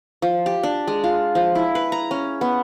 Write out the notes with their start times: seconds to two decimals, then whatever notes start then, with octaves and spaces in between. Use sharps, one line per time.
0.22 F3
0.46 G4
0.63 D4
0.87 G#3
1.04 F4
1.35 F3
1.55 E4
1.75 B4
1.92 A#5
2.11 C#4
2.41 B3